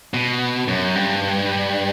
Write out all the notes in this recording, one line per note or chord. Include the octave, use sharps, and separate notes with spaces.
B2
F#2
G2